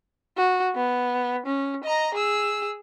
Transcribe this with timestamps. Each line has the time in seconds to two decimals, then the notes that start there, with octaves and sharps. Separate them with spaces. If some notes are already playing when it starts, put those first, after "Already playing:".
0.38 F#4
0.76 B3
1.46 C#4
1.84 D#5 A#5
2.15 G#4 E6